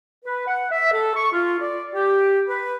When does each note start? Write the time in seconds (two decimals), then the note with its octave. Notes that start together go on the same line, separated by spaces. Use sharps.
0.25 B4
0.47 F#5
0.71 E5
0.93 A4
1.15 C#6
1.33 F4
1.60 D5
1.93 G4
2.47 B4